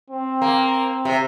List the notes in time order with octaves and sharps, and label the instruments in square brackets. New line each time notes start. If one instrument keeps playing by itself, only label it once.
[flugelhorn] C4
[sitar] A#3
C3